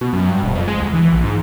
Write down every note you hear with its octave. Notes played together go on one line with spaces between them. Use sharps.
B2
F#2
G2
E1
F2
G#3
D2
E3
A#1
G#2